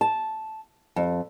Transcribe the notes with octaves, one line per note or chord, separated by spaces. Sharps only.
A5
F2